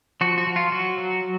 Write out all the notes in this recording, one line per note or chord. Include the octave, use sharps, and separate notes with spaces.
F3 F#4
F#4
F3
F4
F#3 F#4
F#3